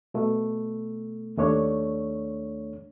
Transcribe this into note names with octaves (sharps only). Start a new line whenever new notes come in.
B2 A3
D#2 A3 D4 C#5